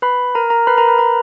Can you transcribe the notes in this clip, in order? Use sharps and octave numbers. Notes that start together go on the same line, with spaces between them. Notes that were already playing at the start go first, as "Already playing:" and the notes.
B4 B5
A#4 A#5
A#4 A#5
B4 B5
A#4 A#5
B4 B5
A#4 A#5